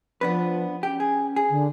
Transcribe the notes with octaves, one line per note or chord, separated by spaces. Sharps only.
F3 B3 D4 B4
C#4 G4
G#4
G#4
D3